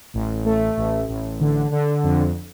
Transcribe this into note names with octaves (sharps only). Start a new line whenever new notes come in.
A1
A3
A1
A1
D3
D3
F2